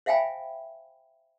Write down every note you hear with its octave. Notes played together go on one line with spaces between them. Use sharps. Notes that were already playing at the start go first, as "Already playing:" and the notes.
C5 E5 F5 G5 G#5 B5